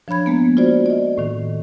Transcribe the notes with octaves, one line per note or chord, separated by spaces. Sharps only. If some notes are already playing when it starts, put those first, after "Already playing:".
F3 D4 C#5 B5 G#6
G#3 A#3 B3
F4 F#4 C5 D5
D5 D#5
A2 D#3